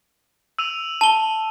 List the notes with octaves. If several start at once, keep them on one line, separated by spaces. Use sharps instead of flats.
E6 D#7 F7
A5 G7